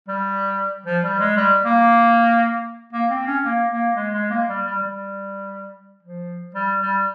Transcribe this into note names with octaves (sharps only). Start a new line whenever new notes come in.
G3
F3
G3
G#3
G3
A#3
A#3
C4
C#4
A#3
A#3
G#3
G#3
A#3
G3
G3
G3
F3
G3
G3